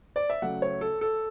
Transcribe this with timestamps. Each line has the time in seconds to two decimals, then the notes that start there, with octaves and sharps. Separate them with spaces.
0.16 D5
0.30 E5
0.42 C#3 F#3 A3 F#5
0.62 C#5
0.81 A4
1.01 A4